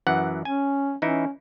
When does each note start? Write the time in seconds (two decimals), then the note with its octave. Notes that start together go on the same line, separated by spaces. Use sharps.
0.07 F#2 E3 F#5
0.45 C#4 G#5
1.02 E3 C#4 D#4 E4